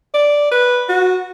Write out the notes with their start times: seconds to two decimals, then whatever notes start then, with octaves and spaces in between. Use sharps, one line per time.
0.14 D5
0.52 B4
0.89 F#4